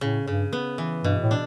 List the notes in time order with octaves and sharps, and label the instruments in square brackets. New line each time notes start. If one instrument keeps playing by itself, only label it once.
[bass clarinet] A2 [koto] C#3
[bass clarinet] G2 [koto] C#3
[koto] B3
E3
[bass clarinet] G2 [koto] B2
[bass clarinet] A2
[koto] D4